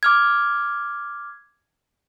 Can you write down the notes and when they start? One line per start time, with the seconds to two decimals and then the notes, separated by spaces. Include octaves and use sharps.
0.03 D6 F6 G#6